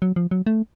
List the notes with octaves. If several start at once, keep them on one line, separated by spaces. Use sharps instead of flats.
F#3
F3
F#3
A3